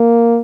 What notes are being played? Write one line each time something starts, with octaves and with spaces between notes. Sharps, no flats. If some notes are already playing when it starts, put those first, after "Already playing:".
Already playing: A#3